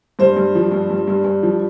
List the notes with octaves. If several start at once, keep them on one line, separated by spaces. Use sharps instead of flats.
G2 C5
G2
F3
G2
G2
G2
G2
F3